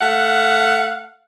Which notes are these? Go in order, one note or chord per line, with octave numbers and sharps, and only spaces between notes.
A3 F5 F#5